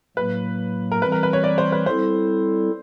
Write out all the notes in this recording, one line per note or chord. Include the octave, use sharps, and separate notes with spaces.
A2 F#3 A#3 B4
A#4
E3 G3 C4 B4
A#4
B4
C#5
D5
C5
B4
G3 C4 E4 A4 C5